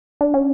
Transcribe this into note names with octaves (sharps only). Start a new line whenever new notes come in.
D4
C#4